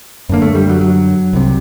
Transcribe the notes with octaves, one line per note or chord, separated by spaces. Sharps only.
F#2 D3 A#3
A3
G3
F#3
F#3
C2 C3